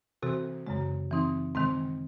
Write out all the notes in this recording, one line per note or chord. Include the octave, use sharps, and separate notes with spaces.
C3 E3 C4 F#4 A4
F#2 C#3 G#3
E3 C4 D#4
C3 D#3 G#3 C4